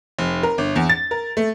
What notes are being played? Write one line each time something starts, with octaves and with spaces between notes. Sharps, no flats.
F1
A#4
G1
E2
A6
A#4
A3